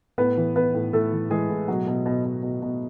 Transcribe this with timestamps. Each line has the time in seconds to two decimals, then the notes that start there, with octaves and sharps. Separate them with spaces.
0.18 A2 B3 B4
0.37 E3
0.56 E3 B3 B4
0.74 A2
0.93 A2 A3 A4
1.12 E3
1.30 E3 G#3 G#4
1.49 A2
1.68 B2 F#3 F#4
1.87 B2
2.06 B2
2.25 B2
2.43 B2
2.62 B2